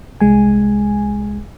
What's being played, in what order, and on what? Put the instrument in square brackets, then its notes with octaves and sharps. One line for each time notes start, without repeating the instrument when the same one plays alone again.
[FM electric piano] C2 G#3 G#5